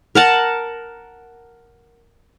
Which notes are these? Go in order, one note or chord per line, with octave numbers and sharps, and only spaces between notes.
A#4 F#5 A5